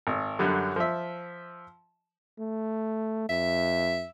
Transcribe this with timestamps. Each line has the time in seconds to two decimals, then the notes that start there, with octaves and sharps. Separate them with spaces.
0.07 G#1
0.39 F#2 D3 F#3 G3
0.76 F3 E5
2.39 A3
3.29 F2 E5